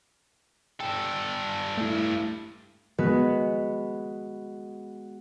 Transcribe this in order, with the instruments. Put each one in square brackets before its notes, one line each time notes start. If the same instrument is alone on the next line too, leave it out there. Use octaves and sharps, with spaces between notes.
[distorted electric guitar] G2 A4 [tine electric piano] G5
[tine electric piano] A3 E4
[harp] G#3 B3 F#4 B4